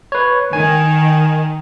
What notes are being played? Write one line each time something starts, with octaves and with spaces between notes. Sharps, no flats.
B4 C#5
D#3 G#5